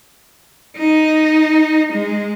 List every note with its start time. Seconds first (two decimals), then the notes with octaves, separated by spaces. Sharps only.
0.77 D#4
1.93 G#3